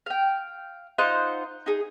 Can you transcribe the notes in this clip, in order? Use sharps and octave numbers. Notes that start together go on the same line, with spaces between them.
F5 G5
D#4 F4 C5 F#5
D#4 G#4